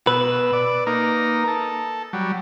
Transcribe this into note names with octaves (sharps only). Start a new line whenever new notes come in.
B2 B4 E6
D5
A#3 D#4 A#4
A4
F#3 G3